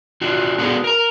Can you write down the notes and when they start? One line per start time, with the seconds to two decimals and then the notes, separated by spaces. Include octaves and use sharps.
0.21 D4 F4 F#4
0.58 A3 B3 D4 F#4 G#4
0.84 A#4 A#5